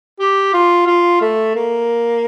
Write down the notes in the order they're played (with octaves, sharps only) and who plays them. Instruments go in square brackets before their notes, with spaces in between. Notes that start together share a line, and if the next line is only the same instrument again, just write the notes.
[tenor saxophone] G4
F4
F4
A3
A#3